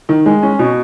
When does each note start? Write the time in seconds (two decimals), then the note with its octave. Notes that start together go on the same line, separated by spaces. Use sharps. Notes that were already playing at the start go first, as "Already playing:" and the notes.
0.09 D#3
0.26 G#3
0.43 C#4
0.59 B2